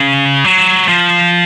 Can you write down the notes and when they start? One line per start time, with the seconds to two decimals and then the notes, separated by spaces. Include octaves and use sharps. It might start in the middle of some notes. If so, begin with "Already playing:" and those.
Already playing: C#3
0.45 F#3
0.88 F3